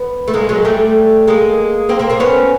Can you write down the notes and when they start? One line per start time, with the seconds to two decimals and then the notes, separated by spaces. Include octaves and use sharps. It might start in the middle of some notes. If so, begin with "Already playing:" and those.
Already playing: B3
0.28 A3
0.34 G#3 A#3
0.49 F#3 G#3
0.65 G3 A3
1.27 G#3 A#3
1.89 A#3 C4
1.99 A#3 C4
2.10 A#3 C4
2.20 B3 C#4